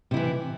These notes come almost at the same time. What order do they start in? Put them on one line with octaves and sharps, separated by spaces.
C3 E4 E3